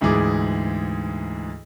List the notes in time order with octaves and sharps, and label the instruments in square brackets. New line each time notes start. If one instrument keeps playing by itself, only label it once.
[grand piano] D2 G#2 E3 G#4 D6